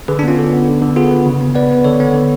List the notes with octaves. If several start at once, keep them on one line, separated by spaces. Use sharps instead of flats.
D3 G#4 B4
D4
B3 C#4 F4
D3
B3
D3
D3
B3 F4 G#4
B3
C#3
B3
B3 B4 D5
B3
D3 A4 C#5
B3
D3